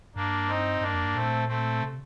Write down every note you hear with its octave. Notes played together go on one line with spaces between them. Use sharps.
G2 A#3 D4
C4 D#4
G2 A#3 D4
F2
G2
A#2 A3 C4
A3 C4
C3